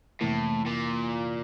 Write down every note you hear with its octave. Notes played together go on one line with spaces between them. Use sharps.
F2 A2 C3 E3 A#3 E4
A#2